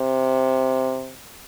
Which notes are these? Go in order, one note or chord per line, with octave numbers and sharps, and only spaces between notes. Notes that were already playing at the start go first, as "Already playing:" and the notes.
Already playing: C3